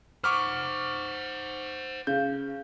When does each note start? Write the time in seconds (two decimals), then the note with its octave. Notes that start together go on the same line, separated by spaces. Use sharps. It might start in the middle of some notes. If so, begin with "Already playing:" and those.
0.24 C5 F#5 C#6 D6 F6
2.07 C#3 G6